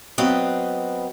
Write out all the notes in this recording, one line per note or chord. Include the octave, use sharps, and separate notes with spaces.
F#3 B3 C4 B4 D#5 F5